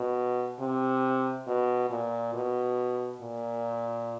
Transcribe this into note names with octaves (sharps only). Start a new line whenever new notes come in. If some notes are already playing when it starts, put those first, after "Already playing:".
Already playing: B2
C3
B2
A#2
B2
A#2